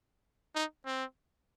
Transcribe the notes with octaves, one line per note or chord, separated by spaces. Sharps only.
D#4
C4